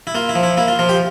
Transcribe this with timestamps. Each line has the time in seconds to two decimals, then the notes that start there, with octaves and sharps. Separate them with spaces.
0.07 E4
0.15 A#3 F4
0.29 E4
0.35 F3
0.43 E4
0.57 A#3 E4
0.68 F4
0.79 F3 F4
0.89 G4